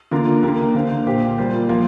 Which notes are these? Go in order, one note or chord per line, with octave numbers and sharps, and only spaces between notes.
D3 A#3 F4 A#4
D3 A#3 G4 A#4
D3 A#3 G4 C5 F5
A#2 A#3 G4 C5 F5
G3 A#3 F4 C5
F3 A#3 F4